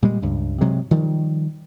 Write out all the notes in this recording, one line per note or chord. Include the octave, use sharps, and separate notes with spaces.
A#2 G3 G#3
C#2 G2
C3 F#3 G#3
D#3 F3 G3